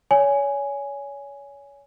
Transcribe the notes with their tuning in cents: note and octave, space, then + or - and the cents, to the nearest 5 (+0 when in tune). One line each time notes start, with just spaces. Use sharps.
C#5 +30 G#5 +0